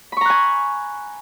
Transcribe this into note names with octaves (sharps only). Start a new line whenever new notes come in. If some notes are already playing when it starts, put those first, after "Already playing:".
G#5 A#5 B5 C#6 F#6